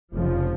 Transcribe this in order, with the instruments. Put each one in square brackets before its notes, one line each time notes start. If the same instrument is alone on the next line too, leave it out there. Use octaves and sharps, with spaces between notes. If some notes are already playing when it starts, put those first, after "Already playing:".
[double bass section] F1 F2 C#3 F3